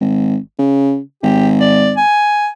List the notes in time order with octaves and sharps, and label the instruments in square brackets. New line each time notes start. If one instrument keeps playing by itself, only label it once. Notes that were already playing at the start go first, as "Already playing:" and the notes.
[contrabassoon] G#1
C#3
[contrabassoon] G#1 [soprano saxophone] G4
[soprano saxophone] D5
G#5